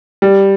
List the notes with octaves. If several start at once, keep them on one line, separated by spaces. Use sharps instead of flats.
G3